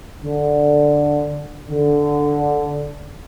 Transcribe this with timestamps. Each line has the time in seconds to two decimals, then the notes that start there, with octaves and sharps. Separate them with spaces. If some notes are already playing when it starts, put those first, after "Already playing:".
0.23 D3
1.70 D3